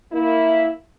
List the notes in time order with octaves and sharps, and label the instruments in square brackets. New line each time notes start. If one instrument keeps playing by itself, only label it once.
[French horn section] A#3 E4